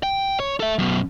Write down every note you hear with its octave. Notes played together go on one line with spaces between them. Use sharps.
G5
C#5
A4 E5
F#2 B2